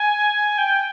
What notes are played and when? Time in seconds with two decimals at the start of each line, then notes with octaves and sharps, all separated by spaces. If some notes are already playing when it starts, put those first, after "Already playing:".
Already playing: G#5
0.58 G5